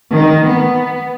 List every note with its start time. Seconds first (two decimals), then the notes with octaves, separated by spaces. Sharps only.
0.13 D#3
0.50 B3